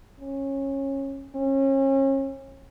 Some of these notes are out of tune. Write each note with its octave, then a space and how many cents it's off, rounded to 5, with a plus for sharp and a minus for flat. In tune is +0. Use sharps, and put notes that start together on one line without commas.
C#4 -20
C#4 -35